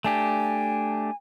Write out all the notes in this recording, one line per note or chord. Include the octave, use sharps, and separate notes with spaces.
A3 D4 G4 G#5